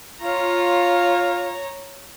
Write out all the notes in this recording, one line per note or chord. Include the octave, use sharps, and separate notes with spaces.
F4 C#5 A#5